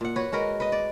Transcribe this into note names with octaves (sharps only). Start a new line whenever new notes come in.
A#2 F#5
F#4 B4 C#5
G#3 F#4 A#4 B4
B4 D#5
D5